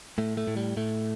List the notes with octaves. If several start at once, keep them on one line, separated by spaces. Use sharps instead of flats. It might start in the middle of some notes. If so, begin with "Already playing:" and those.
A2 A3
A3
A2
G3
A2 A3